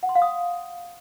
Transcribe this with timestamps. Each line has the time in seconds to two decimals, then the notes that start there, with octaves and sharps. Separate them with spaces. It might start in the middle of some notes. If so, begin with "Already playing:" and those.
0.03 F#5
0.09 C6
0.15 F5
0.22 D#6